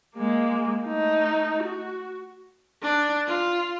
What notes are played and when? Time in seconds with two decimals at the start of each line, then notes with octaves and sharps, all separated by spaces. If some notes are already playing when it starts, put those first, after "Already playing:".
0.17 G#3 A#3
0.86 A3 D#4
1.63 F#4
2.82 D4
3.27 F4